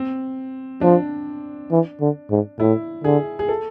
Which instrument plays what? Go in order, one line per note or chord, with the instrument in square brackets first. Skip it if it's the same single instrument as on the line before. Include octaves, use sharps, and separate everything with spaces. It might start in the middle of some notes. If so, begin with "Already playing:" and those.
Already playing: [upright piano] C4
[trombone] F3 [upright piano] D4
[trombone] E3
D3
G#2
[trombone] A2 [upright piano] E4
[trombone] D3 [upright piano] G#4
[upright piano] G#4
A4